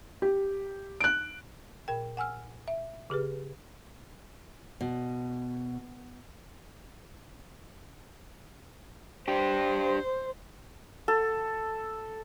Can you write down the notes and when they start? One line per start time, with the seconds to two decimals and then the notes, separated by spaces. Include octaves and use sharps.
0.22 G4
1.01 F#6 D7
1.88 A#2 A#4 G5
2.17 F#5 G#5 E6 F6
2.68 E5
3.10 C#3 G4 G#4 B4
4.81 B2
9.28 D4 G4 C5
11.08 A4